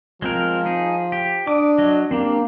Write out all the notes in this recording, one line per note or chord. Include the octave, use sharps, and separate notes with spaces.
F3 G#3 C4 A#4
D#4 G#4
G4
D4 D6 D#6
F#3 D#5
A#3 C4 D4 G4